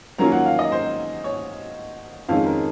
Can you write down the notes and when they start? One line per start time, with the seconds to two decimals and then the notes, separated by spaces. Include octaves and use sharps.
0.18 D#3 F#3 A#3 C#4 F4 A#5
0.32 F#5
0.46 F5
0.59 D#5
0.72 C5
1.24 C#5
2.29 F2 D#3 G#3 C#4 F5
2.46 A#4